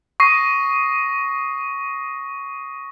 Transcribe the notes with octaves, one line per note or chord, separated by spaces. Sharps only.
C#6 D#6 A#6 C7 D#7